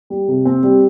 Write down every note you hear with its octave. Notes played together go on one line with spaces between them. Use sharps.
G3
C3
C4
G3